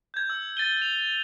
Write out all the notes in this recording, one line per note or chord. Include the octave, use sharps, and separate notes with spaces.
G6 G#6
E6
A6 D#7 G7
F7